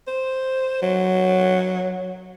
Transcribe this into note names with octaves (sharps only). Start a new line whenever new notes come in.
C5
F#3